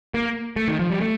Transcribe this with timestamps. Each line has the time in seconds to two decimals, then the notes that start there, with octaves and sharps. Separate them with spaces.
0.14 A#3
0.56 A3
0.68 D#3
0.79 F3
0.90 G3
1.01 A3